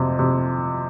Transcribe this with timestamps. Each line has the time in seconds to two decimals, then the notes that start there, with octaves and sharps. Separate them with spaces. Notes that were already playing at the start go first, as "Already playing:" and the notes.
Already playing: F2 C3
0.19 C3